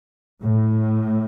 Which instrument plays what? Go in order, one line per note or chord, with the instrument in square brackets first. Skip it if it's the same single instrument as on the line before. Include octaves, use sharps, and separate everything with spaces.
[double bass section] A2